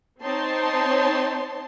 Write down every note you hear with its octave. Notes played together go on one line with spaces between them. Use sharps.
C4 D#4 C#5 A5 C6